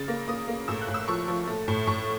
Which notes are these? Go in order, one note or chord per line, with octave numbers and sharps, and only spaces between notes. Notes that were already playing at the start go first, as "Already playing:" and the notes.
Already playing: C#3 A6
A#3
A#3 D#6
A#3
A2 E6
F#6
A2
E6
F3 C#6
F3
A3
A2
A2 C#6